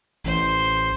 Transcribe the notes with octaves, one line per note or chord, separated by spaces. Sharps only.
A1 C5